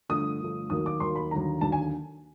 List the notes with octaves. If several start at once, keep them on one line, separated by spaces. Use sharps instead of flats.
G2 D3 F3 A3 D#6
G2 D3 F3 A3
D#2 D#3 F#3 A#3 D#6
D6
D#2 D#3 F#3 A#3 C6
B5
D#2 D3 F#3 A#5
D#2 D3 F#3 A5
G#5